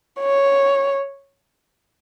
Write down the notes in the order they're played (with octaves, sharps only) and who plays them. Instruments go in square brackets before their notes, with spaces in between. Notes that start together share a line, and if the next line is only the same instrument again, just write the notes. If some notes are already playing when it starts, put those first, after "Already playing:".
[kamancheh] C#5